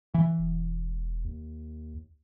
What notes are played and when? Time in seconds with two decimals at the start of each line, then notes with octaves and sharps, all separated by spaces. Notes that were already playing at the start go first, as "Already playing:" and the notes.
0.14 E3
0.38 E1
1.25 D#2